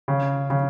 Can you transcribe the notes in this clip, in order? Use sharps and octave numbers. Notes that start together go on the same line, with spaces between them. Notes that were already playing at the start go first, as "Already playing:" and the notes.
C#3
C#3